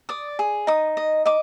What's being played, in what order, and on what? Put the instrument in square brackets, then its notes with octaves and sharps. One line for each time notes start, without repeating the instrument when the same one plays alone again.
[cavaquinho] D5 D#6
G#4
D#4 D#6
D#5
D#5 D6